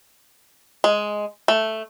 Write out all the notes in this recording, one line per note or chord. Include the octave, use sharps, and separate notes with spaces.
G#3
A3